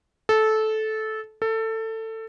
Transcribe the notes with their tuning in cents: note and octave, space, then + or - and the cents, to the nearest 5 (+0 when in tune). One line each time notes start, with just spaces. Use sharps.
A4 -15
A4 +20